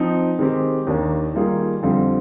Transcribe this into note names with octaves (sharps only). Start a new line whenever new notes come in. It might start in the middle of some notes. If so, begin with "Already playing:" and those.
Already playing: F3 C4 D#4
D#3 G#3 C4 G4
D#2 D#3 A#3 D4
D#3 G3 A#3 F4 G#4
F2 D3 G3 C4 F4